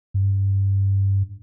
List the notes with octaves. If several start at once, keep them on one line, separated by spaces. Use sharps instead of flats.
G2